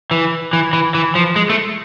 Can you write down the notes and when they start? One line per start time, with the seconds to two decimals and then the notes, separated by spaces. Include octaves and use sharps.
0.11 E3
0.53 E3
0.73 E3
0.94 E3
1.15 F3
1.36 G#3
1.49 A3